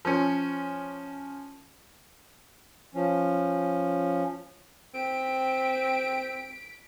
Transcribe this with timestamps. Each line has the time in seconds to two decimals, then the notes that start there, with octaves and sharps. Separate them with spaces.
0.05 F3 C#4
2.95 F3 C#4
4.94 C4 G5 B6 D7